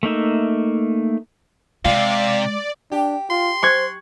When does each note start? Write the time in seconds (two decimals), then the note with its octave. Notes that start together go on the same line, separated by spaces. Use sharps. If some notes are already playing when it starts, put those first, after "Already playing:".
0.03 A3 A#3 D#4 E5
1.85 C3 G#3 D5 F5
2.92 D4 G4
3.30 F4 C6
3.63 C5 C#6 F#6 G#6